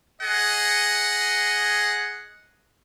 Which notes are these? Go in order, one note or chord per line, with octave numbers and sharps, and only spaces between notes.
G#4 D#5 F#5